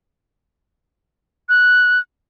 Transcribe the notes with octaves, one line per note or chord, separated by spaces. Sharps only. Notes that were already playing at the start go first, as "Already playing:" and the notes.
F#6